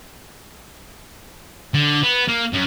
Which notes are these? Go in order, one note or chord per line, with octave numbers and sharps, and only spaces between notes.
D3
B3
A#3
F#2